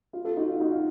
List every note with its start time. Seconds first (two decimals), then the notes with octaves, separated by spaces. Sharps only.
0.13 F4
0.25 F4 A4
0.37 D#4 F#4
0.48 F4
0.60 D#4 F#4
0.72 F4